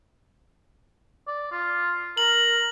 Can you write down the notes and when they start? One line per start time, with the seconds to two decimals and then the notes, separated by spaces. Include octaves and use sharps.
1.28 D5
1.52 F4
2.17 A#4 F#7